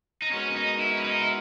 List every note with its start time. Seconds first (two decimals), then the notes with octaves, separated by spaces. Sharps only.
0.22 D#4
0.31 G#3 B3 C#4 F#4 A#4
0.50 C#4
0.56 D#4
0.81 E4
0.97 C#4
1.04 D#4
1.21 E4